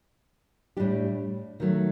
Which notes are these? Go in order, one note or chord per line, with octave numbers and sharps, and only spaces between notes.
A2 G3 D4 G4
D#3 F#3 A3